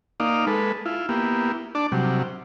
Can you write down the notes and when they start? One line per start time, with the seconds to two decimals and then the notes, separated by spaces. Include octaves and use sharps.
0.20 A#3 D#4 D5 F5
0.47 G#3 A4 B4
0.86 E4 F4
1.09 A#3 B3 E4 G4
1.75 D4 D5 A5
1.92 C3 F#3 G3